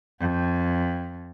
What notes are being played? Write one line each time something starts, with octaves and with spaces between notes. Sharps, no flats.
F2